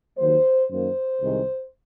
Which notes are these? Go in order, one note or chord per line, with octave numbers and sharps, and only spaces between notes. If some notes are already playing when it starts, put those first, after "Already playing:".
D#2 D#3 F#3 A#3 C5
F#2 D#3 A#3 C5
C2 C3 D#3 G#3